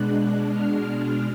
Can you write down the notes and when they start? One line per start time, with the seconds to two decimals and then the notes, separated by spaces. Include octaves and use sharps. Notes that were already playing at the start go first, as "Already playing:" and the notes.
Already playing: B2 G#3 D4 F#6
0.48 F6